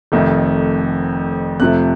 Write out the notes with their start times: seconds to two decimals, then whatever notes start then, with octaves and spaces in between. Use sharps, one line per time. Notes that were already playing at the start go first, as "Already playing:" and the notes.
0.12 F1 F2 D#3 A3
1.60 F2 C3 F3 A3 F#6